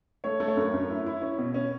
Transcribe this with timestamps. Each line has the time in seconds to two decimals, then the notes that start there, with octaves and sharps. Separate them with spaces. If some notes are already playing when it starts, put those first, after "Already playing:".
0.24 A3 C#5
0.40 A3
0.48 C#5
0.57 F#2
0.74 F#2
0.90 E4
1.06 E4
1.22 C#4
1.38 B2
1.54 C#4